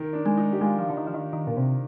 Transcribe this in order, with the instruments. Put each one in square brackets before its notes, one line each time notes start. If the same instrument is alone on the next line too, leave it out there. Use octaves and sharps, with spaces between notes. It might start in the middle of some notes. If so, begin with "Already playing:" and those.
Already playing: [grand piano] D#3
D4
[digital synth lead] G#3
[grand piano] D#4
G4
[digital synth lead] G#3 [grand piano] F4
[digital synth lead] F3
D3
D#3
F3
D#3
D#3
A#2
C3